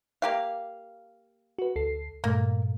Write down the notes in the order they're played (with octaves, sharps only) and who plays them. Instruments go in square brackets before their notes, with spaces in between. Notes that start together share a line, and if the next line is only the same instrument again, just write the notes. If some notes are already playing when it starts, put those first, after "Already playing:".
[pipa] A#3 G4 F5
[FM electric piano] F#4 B4
D2 A4 C7
[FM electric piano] G2 A#2 A3 [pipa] A#3